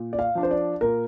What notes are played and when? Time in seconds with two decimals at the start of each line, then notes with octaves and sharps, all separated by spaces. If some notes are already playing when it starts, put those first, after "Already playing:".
Already playing: A#2
0.13 D5
0.19 F5
0.35 F3 D4
0.43 C5
0.51 D5
0.81 A#2 A#4